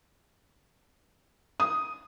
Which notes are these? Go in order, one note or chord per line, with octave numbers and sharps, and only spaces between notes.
D#6